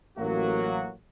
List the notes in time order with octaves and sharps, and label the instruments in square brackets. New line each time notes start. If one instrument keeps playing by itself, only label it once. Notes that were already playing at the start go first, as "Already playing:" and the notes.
[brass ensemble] A1 F#3 A#3 F#4